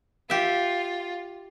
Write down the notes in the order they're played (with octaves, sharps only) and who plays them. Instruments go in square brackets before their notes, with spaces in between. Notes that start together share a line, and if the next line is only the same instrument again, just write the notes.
[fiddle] F4 [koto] G4 E5